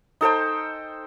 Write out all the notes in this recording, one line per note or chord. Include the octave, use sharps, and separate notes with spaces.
D#4 A4 C5 G5